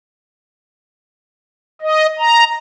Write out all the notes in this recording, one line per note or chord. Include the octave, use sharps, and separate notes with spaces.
D#5
A#5